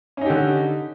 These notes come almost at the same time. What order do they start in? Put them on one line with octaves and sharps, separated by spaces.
C#4 D#4 G4 D3